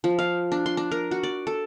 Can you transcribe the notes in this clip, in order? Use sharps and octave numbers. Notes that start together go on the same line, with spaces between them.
F3
F5
D4
C6
D4
A#4
F#4
D5
A4